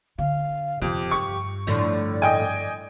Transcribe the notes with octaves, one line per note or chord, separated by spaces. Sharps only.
D3 F5
F2 C3 G4
G2 C#6
A2 D3 F3 D5
D#5 G5 G#5